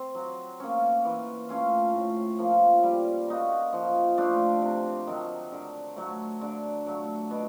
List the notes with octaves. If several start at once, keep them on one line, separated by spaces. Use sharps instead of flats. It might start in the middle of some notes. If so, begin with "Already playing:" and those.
Already playing: C4
F#3
A#3 C#4
E3
A3 C#4 F4
A2
F3 A#3
G3
A#3 D#4 F#4
F3
A3 D4 F4
C3
D#3 F#3
D3
F#3 A3
D3
F#3 A3
B2